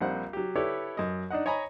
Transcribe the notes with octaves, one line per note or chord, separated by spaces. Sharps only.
A#1 G3 C4 F#5
F#3 G4
E4 G4 A4 B4 C#5 D5
F#2 D#5
D4 D#4 D#5 F#5
C#5 D#5 G#5 A#5 B5